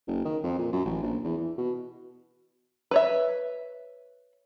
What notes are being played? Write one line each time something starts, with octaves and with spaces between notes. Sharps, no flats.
F#1
D#3
F2
A#2
F#2
A1
A#1
E2
E3
B2
B4 C#5 E5